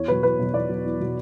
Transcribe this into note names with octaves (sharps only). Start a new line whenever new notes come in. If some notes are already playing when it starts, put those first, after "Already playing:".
Already playing: E2 C#5
B2 F#3 B4
E2 B4
B2 F#3
E2 D5
B2 F#3
E2
B2 F#3